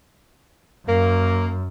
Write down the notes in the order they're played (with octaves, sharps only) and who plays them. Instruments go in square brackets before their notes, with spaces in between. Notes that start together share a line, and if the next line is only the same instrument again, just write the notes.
[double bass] F#2 [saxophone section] A#3